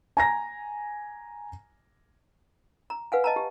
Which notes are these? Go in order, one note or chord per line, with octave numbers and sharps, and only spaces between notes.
G#5 A#5 A#6
A#5
B4 F5 F#5 G#5
D#5 A5 A#5
G4